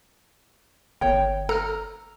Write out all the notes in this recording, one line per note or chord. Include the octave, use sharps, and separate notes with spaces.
G1 C#5 G5
A4 A#5 F6